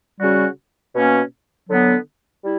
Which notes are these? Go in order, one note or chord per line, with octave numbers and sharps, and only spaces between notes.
C#3 G3 C#4 F#4
B2 A#3 C#4
D3 F#3 B3
G3 E4